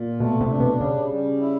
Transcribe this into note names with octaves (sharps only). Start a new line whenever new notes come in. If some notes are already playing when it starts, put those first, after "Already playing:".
Already playing: A#2
B2 A3
C3
D4
B2
C#3 G3
G3
E4